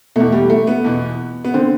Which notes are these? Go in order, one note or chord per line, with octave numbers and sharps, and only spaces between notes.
E2 B2 A3
G3
A3
B3
E2 B2
B3
D3 C4